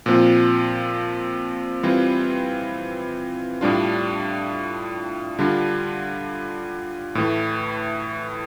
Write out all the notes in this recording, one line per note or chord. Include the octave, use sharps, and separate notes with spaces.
A#2 F3 C4 F4
E3 G3 C4 F4
A2 G3 D4 F4
D3 G3 D4 F4
A2 E3 A3